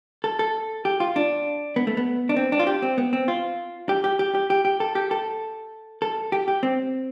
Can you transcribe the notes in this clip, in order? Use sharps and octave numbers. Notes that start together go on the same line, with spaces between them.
A4
A4
G4
F4
D4
B3
A3
B3
D4
C4
D4
F4
G4
C4
B3
C4
F4
G4
G4
G4
G4
G4
G4
A4
G4
A4
A4
G4
G4
C4